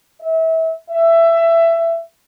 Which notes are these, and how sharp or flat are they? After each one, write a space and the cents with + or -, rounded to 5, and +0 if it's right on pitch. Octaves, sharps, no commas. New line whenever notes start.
E5 -30
E5 +15